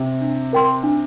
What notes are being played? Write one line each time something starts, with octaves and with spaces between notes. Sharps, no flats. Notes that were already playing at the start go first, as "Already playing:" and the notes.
Already playing: C3
D4
A#4 G5 C6
D4